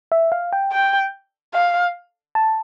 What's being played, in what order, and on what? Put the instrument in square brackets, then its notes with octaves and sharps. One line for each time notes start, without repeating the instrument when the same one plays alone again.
[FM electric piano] E5
F5
G5
[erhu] G5
F5
[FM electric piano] A5